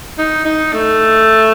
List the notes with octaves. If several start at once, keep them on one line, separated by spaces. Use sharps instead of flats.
D#4
D#4
A3